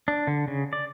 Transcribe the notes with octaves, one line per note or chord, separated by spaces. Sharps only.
D4
D3
C#3
D5